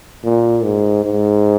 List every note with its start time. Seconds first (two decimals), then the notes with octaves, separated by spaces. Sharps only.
0.24 A#2
0.64 G#2
1.05 G#2